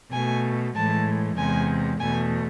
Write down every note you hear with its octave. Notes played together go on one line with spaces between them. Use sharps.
B2 A3 G#5
A2 E3 G#3 A5
E2 C3 G#3 G#5
E2 B2 A3 G#5